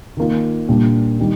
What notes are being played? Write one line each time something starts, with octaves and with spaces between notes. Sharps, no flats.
D#3 A#3 F4
A#2 G3 D4
D#3 G3